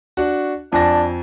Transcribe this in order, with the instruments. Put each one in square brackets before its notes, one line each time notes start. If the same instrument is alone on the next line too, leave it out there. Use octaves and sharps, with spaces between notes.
[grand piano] D4 F#4
[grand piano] F2 G#5 A#6 [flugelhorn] D4